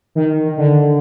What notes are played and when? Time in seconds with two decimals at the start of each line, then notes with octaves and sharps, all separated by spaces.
0.15 D#3
0.58 D3